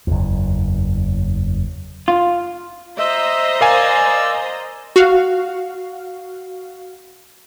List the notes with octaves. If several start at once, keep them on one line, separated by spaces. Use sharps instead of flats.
F#1 E2
F4
C5 D#5 E5 A#5
A#4 D5 F5 G#5 E6
F#4 F5